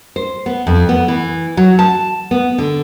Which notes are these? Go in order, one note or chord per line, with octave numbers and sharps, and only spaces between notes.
C5
B3
F2
B3
E3
F#3
A5
B3
D3